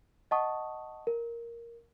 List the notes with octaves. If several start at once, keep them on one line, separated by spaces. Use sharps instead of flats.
D#5 F#5 A5 C#6 D#6
A#4